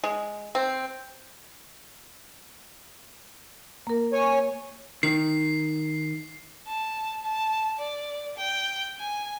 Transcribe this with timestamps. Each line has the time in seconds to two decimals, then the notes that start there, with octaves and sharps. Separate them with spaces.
0.04 G#3
0.55 C4
3.87 A#3 A#4
4.13 C#5 G#5
5.03 D#3 C7
6.67 A5
7.23 A5
7.79 D5
8.38 G5
8.99 G#5